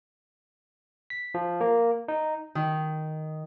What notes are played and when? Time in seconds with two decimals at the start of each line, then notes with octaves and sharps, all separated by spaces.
1.10 B6
1.34 F3
1.61 A#3
2.08 D#4
2.55 D#3